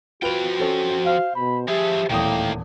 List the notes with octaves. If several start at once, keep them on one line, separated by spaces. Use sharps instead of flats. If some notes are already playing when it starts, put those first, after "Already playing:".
F3 F4 F#4 B4 G5 F7
C#4 A4
C5 F5
B2 B5
F3 G4 G#4 E5
D#1 E2 A2 D#3 A#3 G5 D#6